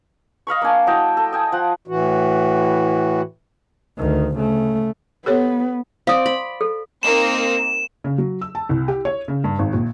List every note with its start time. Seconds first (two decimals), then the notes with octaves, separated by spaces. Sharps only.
0.47 D#5 F5 B5 C#6
0.62 A#3 D4 G#5 A5
0.87 F#3 E4 D#5 G5
1.17 A4
1.33 D#5 G5 G#5
1.52 F3 F#5
1.88 A2 E3 F#4
3.98 D2 D#3
4.35 C#3 A3
5.26 B3 G4 A4 C#5
6.07 C4 D5 F5 D#6
6.26 B5
6.61 A4
7.03 A#3 C4 D#4 E7
8.04 C#3
8.18 F#3
8.41 E6
8.55 A5
8.69 C2
8.88 G4
9.05 C#5
9.28 C#3
9.44 G2
9.59 G#1
9.73 A#1